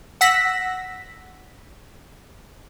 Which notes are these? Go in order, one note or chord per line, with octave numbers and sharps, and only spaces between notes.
F#5 E6 A#6 B6